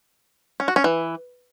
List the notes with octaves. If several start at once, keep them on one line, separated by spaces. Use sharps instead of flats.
C#4
F#4
C#4
E3